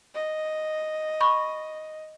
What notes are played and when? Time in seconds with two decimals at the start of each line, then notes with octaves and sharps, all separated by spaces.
0.15 D#5
1.21 B5 C#6